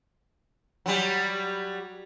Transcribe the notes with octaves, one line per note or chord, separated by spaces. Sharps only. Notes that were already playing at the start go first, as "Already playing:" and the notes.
F#3 G3